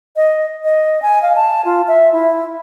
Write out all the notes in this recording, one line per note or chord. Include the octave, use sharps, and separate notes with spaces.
D#5
D#5
G#5
F5
A5
F4
E5
E4